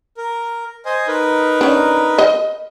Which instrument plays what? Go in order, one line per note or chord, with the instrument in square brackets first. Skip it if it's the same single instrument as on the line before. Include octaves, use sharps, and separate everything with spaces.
[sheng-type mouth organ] A#4
C5 D#5 G#5
D#4 A#4 B4
[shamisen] C#4 D4
D#5